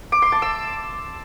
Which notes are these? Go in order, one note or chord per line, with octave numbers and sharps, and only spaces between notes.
D6
C6
A5
E6